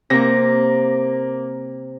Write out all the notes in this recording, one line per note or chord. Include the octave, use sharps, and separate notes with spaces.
C3 A#3 A#6